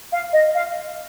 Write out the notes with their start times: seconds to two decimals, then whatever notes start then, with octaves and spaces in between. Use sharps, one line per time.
0.12 F5
0.33 D#5
0.55 F5